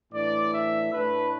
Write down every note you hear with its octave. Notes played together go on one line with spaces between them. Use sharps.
A2 E3 D4 D5
E5
A2 A3 D4 B4